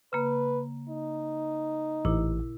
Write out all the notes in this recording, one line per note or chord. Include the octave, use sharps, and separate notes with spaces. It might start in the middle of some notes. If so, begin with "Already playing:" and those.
C#3 A#3 B4
D#4
A1 A#2 E4